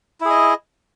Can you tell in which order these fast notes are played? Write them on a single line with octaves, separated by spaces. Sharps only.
E4 G#4 D#5